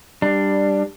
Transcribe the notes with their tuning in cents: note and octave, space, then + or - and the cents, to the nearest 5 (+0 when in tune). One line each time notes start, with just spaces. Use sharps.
G3 +5 D4 +10